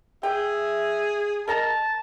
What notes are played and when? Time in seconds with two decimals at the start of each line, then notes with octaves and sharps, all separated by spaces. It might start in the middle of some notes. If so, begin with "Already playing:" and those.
0.23 G#4 E5 G5
1.48 A#4 D#5 A5 A#5